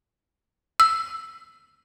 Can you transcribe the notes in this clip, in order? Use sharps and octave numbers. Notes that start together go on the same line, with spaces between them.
E6